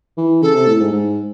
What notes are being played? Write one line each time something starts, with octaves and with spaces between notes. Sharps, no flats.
E3
C#3 A4
C3
A2
G#2
G#2